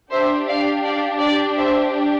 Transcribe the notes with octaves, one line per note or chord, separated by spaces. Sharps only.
D4 G4 C5 E5
D5 F5
D5 F5
D5
C5 E5